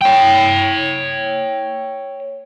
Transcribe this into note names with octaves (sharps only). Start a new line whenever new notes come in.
C#5 G5